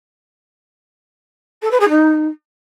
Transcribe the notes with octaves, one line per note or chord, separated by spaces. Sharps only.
A4
B4
G#4
D#4